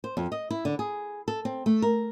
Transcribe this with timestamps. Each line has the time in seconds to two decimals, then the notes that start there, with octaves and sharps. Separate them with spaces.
0.04 C5
0.17 F2
0.32 D#5
0.51 E4
0.65 D3
0.79 G#4
1.28 A4
1.45 C4
1.66 A3
1.82 A#4